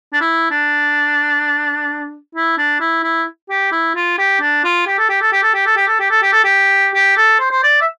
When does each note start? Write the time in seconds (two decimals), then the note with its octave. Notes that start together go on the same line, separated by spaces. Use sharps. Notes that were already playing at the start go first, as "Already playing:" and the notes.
0.13 D4
0.21 E4
0.51 D4
2.35 E4
2.58 D4
2.80 E4
3.03 E4
3.50 G4
3.72 E4
3.95 F4
4.19 G4
4.41 D4
4.64 F4
4.87 G4
4.98 A4
5.09 G4
5.22 A4
5.32 G4
5.43 A4
5.54 G4
5.66 A4
5.77 G4
5.88 A4
6.00 G4
6.10 A4
6.23 G4
6.33 A4
6.44 G4
6.94 G4
7.17 A4
7.40 C5
7.51 C5
7.63 D5
7.81 E5